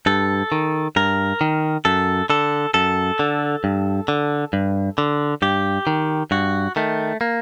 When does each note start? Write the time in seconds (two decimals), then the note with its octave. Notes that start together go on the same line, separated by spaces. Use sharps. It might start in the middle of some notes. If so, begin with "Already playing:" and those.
0.06 G2 A4
0.52 D#3
0.96 G2 A#4
1.41 D#3
1.85 F#2 A4
2.30 D3 A4
2.74 F#2 A4
3.19 D3
3.64 G2
4.08 D3
4.53 G2
4.98 D3
5.42 G2 G4
5.87 D#3
6.31 G2 F#4
6.76 D#3 A3
7.21 A#3